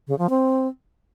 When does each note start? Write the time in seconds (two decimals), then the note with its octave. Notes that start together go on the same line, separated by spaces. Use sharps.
0.07 C#3
0.18 F3
0.29 C4